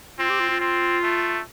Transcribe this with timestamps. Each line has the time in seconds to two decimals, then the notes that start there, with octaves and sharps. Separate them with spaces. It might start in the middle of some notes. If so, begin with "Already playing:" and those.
0.19 C4 F4
0.30 G4
0.40 F4
0.51 F4
0.60 C4
1.03 A3